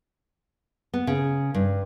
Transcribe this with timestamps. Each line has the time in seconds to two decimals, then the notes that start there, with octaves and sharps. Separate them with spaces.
0.94 B3
1.07 C#3
1.54 G2